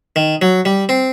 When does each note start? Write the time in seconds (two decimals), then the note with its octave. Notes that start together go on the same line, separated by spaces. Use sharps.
0.16 D#3
0.42 F#3
0.65 G3
0.89 C4